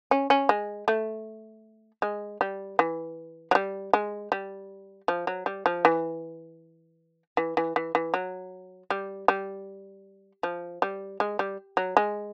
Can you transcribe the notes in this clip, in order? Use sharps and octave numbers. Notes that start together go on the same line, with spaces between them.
C#4
C#4
G#3
A3
G#3
G3
E3
F#3
G3
G#3
G3
F3
F#3
G3
F3
E3
E3
E3
E3
E3
F#3
G3
G3
F3
G3
G#3
G3
F#3
G#3